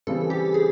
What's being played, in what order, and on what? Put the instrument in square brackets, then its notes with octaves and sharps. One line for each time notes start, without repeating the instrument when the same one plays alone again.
[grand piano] C#3 E3 G3 C4 [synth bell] A4
[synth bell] G4
G#4